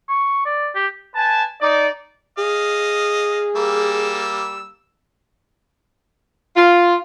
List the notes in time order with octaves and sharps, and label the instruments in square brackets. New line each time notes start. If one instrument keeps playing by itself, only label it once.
[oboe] C#6
D5
G4
[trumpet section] B4 G#5 A5
D#4 D5
[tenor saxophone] G#4 [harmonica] D#5 F5
[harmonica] G3 A#3 E6
[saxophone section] F4